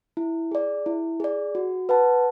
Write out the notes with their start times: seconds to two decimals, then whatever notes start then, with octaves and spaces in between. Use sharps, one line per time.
0.17 E4
0.51 G#4 D5
0.86 E4
1.20 G#4 D5
1.55 F#4
1.89 B4 F#5 A5